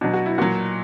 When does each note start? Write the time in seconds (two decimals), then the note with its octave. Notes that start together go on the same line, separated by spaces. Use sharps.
0.01 B2 F#3 D4
0.14 F#4
0.26 E4
0.38 A#2 F#3 F#4